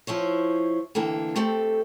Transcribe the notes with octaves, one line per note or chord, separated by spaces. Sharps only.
F3 E4 C5 C#5
D3 E3 A#3 G5 A5
A3 C4 G4 A4